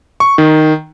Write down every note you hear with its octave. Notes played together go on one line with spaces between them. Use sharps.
C#6
D#3